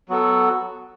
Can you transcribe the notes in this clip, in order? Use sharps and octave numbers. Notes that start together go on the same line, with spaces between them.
F#3 B3 F#4 A4